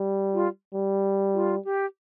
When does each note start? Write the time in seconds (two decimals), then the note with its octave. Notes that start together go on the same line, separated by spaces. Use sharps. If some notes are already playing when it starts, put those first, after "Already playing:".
Already playing: G3
0.34 F4
0.74 G3
1.34 F4
1.65 G4